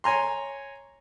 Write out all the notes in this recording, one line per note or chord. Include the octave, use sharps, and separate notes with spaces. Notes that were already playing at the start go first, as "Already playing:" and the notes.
C#5 G#5 A#5 C6